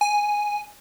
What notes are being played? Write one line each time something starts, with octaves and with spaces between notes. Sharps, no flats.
G#5